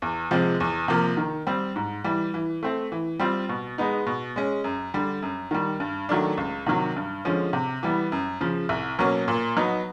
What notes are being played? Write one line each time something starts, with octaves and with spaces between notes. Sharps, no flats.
E2
C3 F3 G#3 C4
E2
C3 F3 A#3
D#3
G3 C4
G#2
E3 G3
E3
A3 C4
E3
G3 C4 F4
B2
G#3 B3 D#4
B2
G#3 C#4
F#2
D3 G3
F#2
D#3 G3
G2
D#3 F#3 A3 D4
C#2
C3 D#3 F#3
G2
D3 F3 G#3 C#4
C3
E3 G3 B3
F#2
C#3 F3
C2
B2 F#3 A#3 C#4
A#2
F#3 B3 D#4